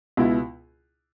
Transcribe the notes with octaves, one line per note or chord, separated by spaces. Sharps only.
C#2 B2 B3 E4